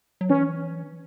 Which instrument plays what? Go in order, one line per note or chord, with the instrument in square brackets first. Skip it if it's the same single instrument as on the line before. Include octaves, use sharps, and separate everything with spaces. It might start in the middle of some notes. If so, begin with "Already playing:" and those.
[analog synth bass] F#3
[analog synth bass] E3 [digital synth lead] C#4